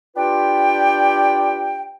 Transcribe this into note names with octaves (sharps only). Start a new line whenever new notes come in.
D4 F4 G4 B4 G5